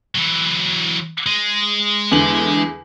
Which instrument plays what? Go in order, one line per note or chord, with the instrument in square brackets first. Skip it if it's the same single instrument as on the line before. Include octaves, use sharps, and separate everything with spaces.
[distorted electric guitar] E3 F#3
G#3
[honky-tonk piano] E2 D3 F#7